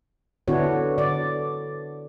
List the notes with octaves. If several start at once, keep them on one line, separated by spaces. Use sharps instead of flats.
D3 B3 D4 E4 F#4 C#5
D3 D5